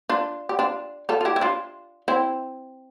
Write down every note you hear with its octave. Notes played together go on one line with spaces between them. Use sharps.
D4 F4
G4
D4 F4
F4 A4
F4
E4 G4
E4
D4 F4
C4 E4